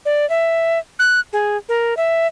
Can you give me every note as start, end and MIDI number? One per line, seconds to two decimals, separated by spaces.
0.05 0.28 74
0.30 0.78 76
0.99 1.20 90
1.33 1.57 68
1.69 1.94 70
1.97 2.27 76